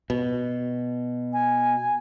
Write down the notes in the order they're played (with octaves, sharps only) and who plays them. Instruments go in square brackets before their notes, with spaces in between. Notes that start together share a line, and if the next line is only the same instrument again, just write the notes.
[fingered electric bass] B2
[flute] G#5